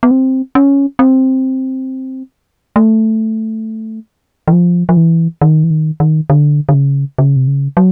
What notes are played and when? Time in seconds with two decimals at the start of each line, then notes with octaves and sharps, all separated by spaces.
0.03 B3
0.11 C4
0.55 C#4
0.99 C4
2.76 A3
4.48 E3
4.53 F3
4.89 F3
4.97 E3
5.41 D#3
5.64 E3
5.71 D#3
6.00 D#3
6.30 D3
6.69 D3
6.74 C#3
7.18 C#3
7.36 C3
7.48 C#3
7.77 F#3